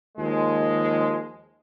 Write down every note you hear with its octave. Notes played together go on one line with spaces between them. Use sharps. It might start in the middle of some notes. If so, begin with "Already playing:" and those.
D#2 F3 G#3